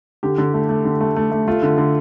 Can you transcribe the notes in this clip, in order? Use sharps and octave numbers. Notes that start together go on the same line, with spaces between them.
D3 G4
D3
A3
A3
D3
A3
A3
A3
A3 F4
D3
D3